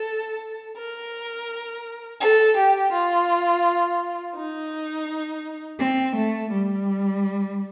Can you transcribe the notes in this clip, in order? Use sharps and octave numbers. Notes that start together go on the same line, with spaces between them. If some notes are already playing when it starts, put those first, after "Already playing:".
Already playing: A4
A#4
A4
G4
F4
D#4
C4
A3
G3